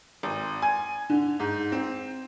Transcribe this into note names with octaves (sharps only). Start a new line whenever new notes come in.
G#1
G#5
D3
G#2
C4